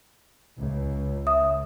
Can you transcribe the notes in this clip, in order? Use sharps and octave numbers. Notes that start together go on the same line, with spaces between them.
C#2
E5 D#6